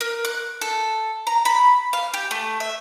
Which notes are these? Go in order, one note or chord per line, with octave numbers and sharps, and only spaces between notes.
A#4
F#6
A4
A#5
B5
F5
G4
A3
E5